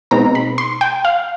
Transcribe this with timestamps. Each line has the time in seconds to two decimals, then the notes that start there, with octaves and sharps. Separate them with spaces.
0.11 B2 G#3 C4 D#4 A#5
0.35 B5
0.58 C6
0.81 G5
1.05 F5